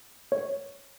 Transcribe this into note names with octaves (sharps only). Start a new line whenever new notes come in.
C#5